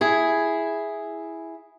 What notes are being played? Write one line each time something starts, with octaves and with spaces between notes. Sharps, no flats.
E4 G#4